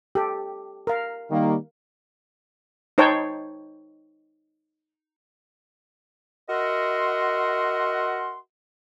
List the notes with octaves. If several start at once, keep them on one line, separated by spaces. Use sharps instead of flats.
G4 A4
A#4 F5
D#3 G3 A#3
D#4 C5 C#5 G5 A5
F#4 A#4 D#5 E5 F#5 C6